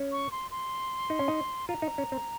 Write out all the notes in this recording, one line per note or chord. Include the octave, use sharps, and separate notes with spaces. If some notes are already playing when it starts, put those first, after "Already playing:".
Already playing: C#4
C#6
C6
C6
D#4
C#4
D#4
F4 A#5
D#4
C#4
C4